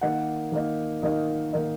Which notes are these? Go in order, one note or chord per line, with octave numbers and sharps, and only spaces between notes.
D#3 A#3 D#4 F#5
D#3 A#3 D#4
D#3 A#3 D#4 D#5
D#3 A#3 D#4